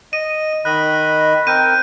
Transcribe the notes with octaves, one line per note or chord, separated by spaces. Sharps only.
D#5 D#7
D#3 D#5 B5 F#6
C4 A#4 G6 D#7